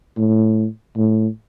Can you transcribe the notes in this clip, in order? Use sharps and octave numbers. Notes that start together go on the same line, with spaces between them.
A2
A2